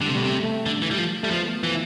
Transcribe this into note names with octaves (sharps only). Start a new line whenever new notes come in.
D3 G3
C3 A3
B2 G3
C3 A3
A3
D3
E3
G3
F3
G3 A3
F3 B3
A3
E3 F3